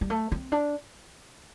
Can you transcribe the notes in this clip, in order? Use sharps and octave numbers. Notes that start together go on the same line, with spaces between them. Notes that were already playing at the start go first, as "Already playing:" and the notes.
G3
A3
C4
D4